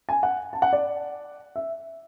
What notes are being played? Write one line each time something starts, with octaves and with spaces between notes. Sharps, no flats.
G#5
F#5
A5
F#5
D5
E5